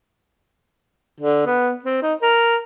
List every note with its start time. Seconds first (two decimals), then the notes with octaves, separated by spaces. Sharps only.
1.20 D3
1.46 B3
1.85 C4
2.02 D#4
2.22 A#4